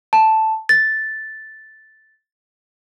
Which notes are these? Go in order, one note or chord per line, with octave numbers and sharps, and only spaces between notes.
A5
A6